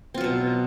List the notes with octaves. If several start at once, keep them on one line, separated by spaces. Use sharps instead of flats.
B2 F#3 C4 F4